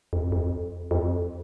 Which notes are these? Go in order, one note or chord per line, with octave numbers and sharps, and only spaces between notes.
F2
F2
F2